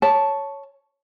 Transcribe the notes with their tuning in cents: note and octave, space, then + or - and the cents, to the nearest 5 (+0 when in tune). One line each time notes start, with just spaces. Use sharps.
C#5 +0 A5 -5